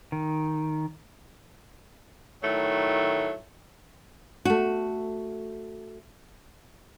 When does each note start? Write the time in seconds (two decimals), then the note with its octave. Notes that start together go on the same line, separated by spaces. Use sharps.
0.12 D#3
2.43 A2 D#3 F#3 A3
4.45 A3 F#4